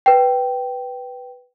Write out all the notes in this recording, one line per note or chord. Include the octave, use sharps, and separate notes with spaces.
B4 G5